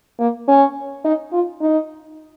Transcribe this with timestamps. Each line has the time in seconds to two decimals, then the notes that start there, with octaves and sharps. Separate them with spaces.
0.19 A#3
0.48 C#4
1.04 D#4
1.32 F4
1.61 D#4